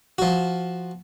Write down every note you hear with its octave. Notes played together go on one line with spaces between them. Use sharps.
F3 F#4